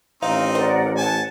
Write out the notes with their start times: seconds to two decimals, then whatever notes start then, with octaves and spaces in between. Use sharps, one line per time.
0.22 A1 C4 D#4 F5
0.55 A#4 C5 D5 F#5
0.97 F#5 G#5 A5